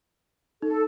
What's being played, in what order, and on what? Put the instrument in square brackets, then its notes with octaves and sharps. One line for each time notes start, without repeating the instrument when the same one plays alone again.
[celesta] D#4 [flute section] A4